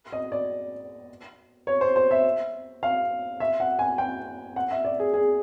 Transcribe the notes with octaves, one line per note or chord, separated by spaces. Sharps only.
D#5
D5
C#5
C5
C5
E5
F5
E5
F#5
G#5
G5
F#5
E5
D5
G#4
G#4